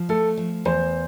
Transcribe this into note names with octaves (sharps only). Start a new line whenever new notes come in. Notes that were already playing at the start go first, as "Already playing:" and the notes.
Already playing: F3
A3 A4
F3
E2 C5